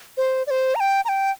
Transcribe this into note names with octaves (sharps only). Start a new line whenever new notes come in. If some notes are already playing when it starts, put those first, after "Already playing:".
C5
D5
C5
A#5
G5
A#5
G5